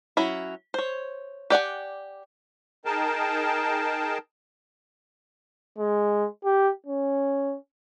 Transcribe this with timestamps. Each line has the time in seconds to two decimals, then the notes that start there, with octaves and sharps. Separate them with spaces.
0.17 F#3 C#4 E4
0.74 C5 C#5
1.50 G4 D5 F#5 G#5
2.85 D#4 G#4 A#4 G5 A5
5.79 G#3
6.45 G4
6.87 C#4